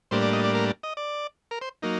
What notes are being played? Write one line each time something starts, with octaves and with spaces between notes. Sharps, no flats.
A2 G3 A#3 D4 C5
D5
D#5
D5
A#4
D#5
D5
A#4
C5
F#3 A#3 D#4